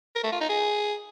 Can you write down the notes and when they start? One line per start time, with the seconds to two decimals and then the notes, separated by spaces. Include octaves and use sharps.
0.15 A#4
0.24 A3
0.32 F4
0.41 D#4
0.49 G#4